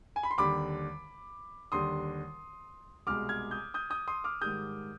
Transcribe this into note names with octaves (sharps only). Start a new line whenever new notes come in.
G#5
B5
C6
D#2 D3 G3 B5 D6
D#2 D3 G3 C6 D#6
C2 B2 G#3 D6 F6
F6 G#6
D#6 G6
D#6 G6
D#6 G6
C6 D#6
D6 F6
G#2 D#3 G3 D#6 G6